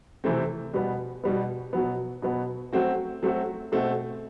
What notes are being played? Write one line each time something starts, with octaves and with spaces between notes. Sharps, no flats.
C3 E3 A3 C4
B2 G3 B3
B2 G3 B3
B2 F#3 B3
B2 F#3 B3
F#3 A3 C4 F#4
F#3 A3 C4 F#4
B2 A3 C4 F#4